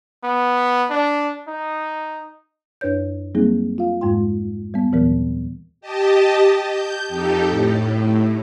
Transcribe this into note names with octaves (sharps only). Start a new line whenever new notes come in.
B3
D4
D#4
F#2 D4 B4 C#5 G6
F#3 G3 A#3 C4 D#4 G#4
F4 F5
F2 G#2 G#3 F4 G5 C6
G3 B3
D#2 A#2 E3 F#3 B3 A#4
G4 D#5 A5
G6
F2 D#4 G4 A4
A2